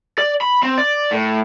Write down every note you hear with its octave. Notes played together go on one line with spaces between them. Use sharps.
D5
B5
C4
D5
A2